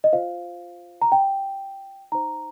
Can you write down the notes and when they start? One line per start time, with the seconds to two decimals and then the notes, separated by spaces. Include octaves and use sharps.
0.04 D#5
0.13 F4 C5 F5
1.02 A#5
1.12 G5
2.12 D#4 C5 A#5